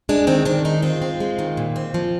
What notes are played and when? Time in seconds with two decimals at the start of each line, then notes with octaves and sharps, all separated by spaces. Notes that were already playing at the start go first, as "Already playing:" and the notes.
0.09 G#3 D4
0.27 D#3 C4
0.45 D#3 D4
0.65 G#3 D#4
0.82 C4 F4
1.02 C4
1.20 G#3
1.39 D#3
1.57 A#2
1.76 C4
1.94 F3